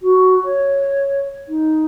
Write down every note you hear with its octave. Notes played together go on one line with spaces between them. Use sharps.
F#4
C#5
D#4